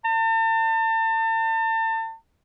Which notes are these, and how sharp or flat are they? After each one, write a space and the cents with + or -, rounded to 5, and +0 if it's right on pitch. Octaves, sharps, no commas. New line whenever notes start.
A5 +35